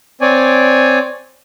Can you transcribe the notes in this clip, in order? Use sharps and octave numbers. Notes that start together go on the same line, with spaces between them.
C4 C#5 D5 G#5